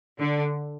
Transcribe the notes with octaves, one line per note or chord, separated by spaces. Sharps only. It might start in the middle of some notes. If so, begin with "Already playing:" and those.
D3